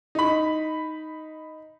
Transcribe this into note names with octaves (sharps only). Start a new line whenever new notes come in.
D#4 B5